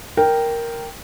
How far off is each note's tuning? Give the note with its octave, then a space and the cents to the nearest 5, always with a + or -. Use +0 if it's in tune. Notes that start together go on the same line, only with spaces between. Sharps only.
A#4 +0 G5 +0